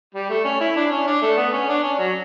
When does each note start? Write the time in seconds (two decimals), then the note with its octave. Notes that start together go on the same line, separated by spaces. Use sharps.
0.14 G3
0.30 A3
0.45 C#4
0.61 E4
0.76 D4
0.92 C#4
1.07 D4
1.22 A3
1.37 B3
1.53 C#4
1.69 D4
1.84 C#4
1.99 F#3